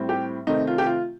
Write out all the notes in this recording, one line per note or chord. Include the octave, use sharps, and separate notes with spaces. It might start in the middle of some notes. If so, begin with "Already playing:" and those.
Already playing: A2 G3 C4
G4
C3 D#3 A3 C4 D#4
F4
G4
F4